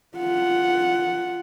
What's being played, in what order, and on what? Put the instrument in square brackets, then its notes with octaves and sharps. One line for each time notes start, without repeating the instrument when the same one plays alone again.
[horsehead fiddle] F4 F#5